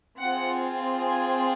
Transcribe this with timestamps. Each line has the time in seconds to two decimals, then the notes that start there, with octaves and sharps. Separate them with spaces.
0.22 C4 F4 G#4 F#5
1.01 G#5